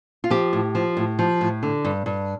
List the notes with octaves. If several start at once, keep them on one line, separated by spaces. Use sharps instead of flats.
F4
F3 G4
A2
F3
A2
F3
A2
D3
G2
G2